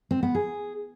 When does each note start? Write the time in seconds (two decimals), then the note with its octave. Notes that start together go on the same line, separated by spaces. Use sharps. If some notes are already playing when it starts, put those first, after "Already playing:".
0.11 C4
0.23 B3
0.35 G#4